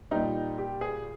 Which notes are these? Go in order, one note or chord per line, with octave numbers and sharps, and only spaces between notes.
A#2 G3 D#4
G4
G#4